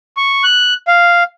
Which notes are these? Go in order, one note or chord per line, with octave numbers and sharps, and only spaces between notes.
C#6
F#6
F5